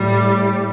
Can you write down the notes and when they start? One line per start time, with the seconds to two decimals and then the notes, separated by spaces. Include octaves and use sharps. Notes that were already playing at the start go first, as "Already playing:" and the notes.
Already playing: A2 G3